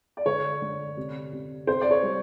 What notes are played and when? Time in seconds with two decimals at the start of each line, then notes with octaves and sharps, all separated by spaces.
0.17 D5
0.26 D3 C#5
0.62 D3
0.97 C3
1.33 C3
1.67 C4 C5
1.81 D5
1.91 C#5
2.03 G3